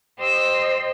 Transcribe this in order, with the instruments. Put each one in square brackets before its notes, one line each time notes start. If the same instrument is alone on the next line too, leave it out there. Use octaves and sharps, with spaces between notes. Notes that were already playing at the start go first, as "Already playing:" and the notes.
[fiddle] G4 E6 [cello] C5 D#5